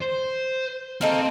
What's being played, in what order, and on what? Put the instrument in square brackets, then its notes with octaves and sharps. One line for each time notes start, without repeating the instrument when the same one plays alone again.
[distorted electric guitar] C5
[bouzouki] A#3 D#4 A4 [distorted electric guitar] C4